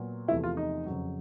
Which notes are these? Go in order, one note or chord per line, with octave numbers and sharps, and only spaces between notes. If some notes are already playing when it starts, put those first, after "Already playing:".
Already playing: A#2 F#3 B3
E2 C3 F3 A3 E4
F4
D#4
F2 C#3 F#3